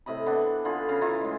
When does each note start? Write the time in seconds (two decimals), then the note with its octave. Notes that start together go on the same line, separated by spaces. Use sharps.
0.06 A2 C3 D#5 B5
0.26 E3 B3 C4 D4
0.65 D3 F4 G#4 B5
0.88 C#3 F5
1.01 E3 E4 F4 A#5
1.21 A2 G#3